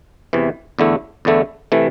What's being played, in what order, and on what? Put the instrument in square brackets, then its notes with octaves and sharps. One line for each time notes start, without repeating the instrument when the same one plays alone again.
[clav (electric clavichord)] E2 C3 E3
E2 D3 A3 E4
E2 D3 A3 E4
C3 E3 A3